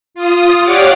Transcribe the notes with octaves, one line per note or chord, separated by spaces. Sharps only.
F4 D#6
G4 C#5 D5 F5 F#5 D6